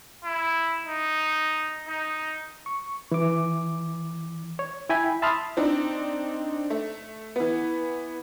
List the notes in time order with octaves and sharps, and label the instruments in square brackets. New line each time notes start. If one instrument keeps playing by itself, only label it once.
[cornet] E4
D#4
D#4
[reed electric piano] C#6
E3 D6
C#5
E4 G5 G#5 B5
E5 A5 B5 C6 D#6 F6
[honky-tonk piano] C4 D4 D#4
A3
E3 B3